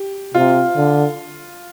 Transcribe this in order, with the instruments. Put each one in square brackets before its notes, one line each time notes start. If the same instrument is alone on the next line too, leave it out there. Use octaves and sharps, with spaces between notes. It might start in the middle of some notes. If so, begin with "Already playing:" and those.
Already playing: [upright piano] G4
[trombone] C3 [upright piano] F4
[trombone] D3